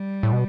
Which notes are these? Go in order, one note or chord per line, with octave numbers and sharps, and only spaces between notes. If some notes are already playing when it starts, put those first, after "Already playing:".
Already playing: G3
A2
B2